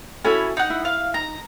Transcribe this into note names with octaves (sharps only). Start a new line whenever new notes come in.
C#4 E4 F#4 A4 G#5 B5
D#4 F#5
E4
F5
D#4 A#5